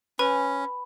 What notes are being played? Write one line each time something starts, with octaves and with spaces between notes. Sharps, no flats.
C#4 B4 G#5 B5